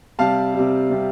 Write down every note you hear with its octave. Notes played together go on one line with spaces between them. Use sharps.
C3 G3 F5 A5
C3 G3
C3 G3